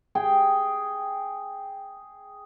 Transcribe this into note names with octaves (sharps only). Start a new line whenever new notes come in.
G#4 G5